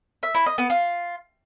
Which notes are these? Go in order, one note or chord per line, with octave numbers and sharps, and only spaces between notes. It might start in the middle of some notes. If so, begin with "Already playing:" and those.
E5
E4
D#5
B3
F4